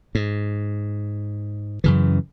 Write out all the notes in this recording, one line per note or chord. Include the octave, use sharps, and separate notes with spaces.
G#2
F#2 C#3 E3